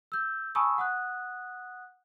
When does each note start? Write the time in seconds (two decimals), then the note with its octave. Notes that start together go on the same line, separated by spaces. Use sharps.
0.12 E6 G6
0.55 G#5 A5 B5 C#6 D#6 E6
0.78 F#5 D#6 F#6